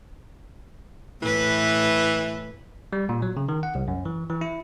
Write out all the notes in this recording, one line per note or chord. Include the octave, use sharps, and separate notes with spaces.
A2 E3 B4
G3
A#2
F#3
C#3
D#3
F#5
C2
F#2
E3
E3
E4